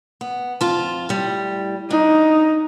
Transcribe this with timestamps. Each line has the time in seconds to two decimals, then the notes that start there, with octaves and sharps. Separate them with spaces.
0.21 B3
0.61 F2 F4 A5
1.09 A2 G3
1.91 D4 D#4